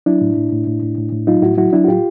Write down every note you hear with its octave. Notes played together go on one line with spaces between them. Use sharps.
F#3 D4 E4
A2
A2
A2
A2
A2
A2
A2
F#3 D#4 F4
A2 E4 F#4
F#3 E4 F#4
F#3 D4 E4
F#4
A2 F4 G4